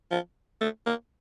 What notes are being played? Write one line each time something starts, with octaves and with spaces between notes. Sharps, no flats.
F3
A3
A#3